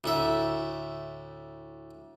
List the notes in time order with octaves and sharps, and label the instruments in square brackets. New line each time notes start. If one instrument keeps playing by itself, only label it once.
[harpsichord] D2 A2 E5